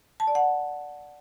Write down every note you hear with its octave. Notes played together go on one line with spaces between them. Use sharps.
A5
D5
F#5